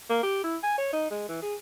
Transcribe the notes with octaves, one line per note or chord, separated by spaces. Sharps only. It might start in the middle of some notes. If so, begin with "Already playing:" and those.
A#3
G4
E4
G#5
C#5
D#4
G#3
E3
G#4